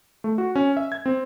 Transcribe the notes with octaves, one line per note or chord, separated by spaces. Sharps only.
A3
F#4
C#4
E5
G#6
C4